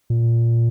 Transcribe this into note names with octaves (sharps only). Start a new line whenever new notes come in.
A#2